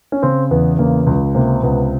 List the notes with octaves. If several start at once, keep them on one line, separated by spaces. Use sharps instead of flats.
C#4
C#3 C4
E2 B3
C#3 A#3
C#2
C3 A#3
C#2 B3